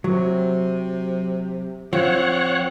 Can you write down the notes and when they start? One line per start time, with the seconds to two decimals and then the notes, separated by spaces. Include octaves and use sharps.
0.04 C3 F#3
1.93 F3 C4 C#5 F#5